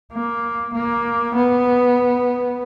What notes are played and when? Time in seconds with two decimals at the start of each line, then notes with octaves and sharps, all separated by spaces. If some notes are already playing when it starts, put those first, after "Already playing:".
0.12 A#3
0.74 A#3
1.35 B3